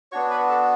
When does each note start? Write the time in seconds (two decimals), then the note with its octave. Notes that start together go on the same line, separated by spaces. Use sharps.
0.12 B3 D4 F#4 C#5 C#6
0.30 B4 B5
0.49 A4 A5